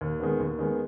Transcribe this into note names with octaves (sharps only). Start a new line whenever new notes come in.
D#2
D#3 G#3 B3
D#2
D#3 G#3 B3